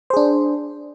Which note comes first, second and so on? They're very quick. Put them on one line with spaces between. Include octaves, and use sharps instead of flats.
C5 G#4 D4